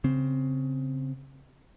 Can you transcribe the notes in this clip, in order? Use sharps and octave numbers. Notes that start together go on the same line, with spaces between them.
C#3 C4